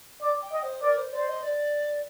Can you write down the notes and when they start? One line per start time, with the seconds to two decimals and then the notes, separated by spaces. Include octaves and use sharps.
0.21 D5 D6
0.41 G5
0.51 D#5
0.62 C5
0.82 A#4 D5
0.97 C5
1.12 C5 D5
1.27 D#5
1.42 D5